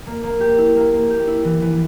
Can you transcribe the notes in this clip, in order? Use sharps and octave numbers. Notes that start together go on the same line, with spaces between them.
A#3
A#3
G4
E4
A#3
A#3
G4
E4
E3
E3